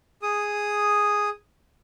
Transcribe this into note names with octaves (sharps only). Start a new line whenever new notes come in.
G#4 D#6